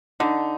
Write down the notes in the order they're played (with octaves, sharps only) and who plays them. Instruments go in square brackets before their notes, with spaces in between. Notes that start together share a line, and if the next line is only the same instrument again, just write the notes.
[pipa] D3 [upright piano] D#4